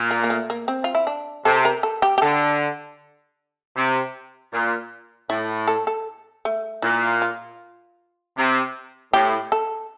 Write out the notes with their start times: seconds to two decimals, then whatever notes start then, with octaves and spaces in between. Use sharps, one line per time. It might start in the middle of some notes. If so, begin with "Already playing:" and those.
Already playing: A#2
0.11 A#3
0.24 A#3
0.30 A3
0.50 A#3
0.68 C4
0.84 F4
0.95 E4
1.07 D4
1.45 C3 A4
1.65 A#4
1.83 A4
2.02 G4
2.18 G4
2.22 D3 A4
3.76 C3
4.52 A#2
5.29 A2 E4
5.68 A4
5.87 A4
6.45 A3
6.82 A#2 E4
7.22 F4
8.37 C3
9.13 A2 G4
9.52 A4